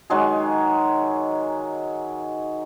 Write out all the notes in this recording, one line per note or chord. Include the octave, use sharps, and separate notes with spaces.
D#3 F#3 G#3 G#4